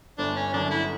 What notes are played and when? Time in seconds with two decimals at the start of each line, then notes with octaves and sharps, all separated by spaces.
0.18 G1 D4
0.36 C#4
0.53 F#2 D3 D4
0.71 E4